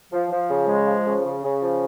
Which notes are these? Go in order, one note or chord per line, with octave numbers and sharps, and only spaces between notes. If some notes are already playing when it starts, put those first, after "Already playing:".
F3
F3
C#3
G#3
F3
C#3
C#3
C#3
F3